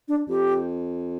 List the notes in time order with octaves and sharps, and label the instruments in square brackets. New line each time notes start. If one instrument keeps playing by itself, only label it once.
[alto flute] D4
[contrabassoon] F2 [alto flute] G4